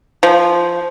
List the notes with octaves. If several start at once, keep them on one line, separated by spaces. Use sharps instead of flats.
F3